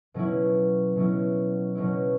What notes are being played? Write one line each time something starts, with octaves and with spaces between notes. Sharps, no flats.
B2 F#3 C#4 E4
B2 F#3 C#4 E4
B2 F#3 C#4 E4